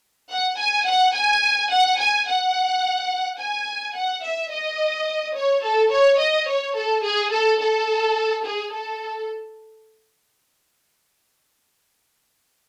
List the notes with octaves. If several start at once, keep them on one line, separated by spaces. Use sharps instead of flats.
F#5
G#5
F#5
G#5
F#5
G#5
F#5
G#5
F#5
E5
D#5
C#5
A4
C#5
D#5
C#5
A4
G#4
A4
A4
G#4
A4